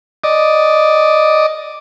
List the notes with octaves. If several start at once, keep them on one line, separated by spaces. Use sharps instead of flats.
D5 D#5